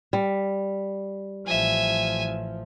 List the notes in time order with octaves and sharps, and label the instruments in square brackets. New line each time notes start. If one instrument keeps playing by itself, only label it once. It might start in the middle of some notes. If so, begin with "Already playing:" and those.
[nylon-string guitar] G3
[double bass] A1 F3 [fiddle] E5 G#5